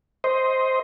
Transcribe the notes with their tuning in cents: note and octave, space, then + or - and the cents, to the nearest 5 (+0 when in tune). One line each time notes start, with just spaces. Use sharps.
C5 +0 D#5 +15